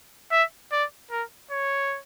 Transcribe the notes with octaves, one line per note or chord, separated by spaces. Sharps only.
E5
D5
A#4
C#5